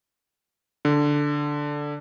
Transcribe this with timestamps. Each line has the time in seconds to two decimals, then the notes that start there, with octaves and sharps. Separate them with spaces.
0.85 D3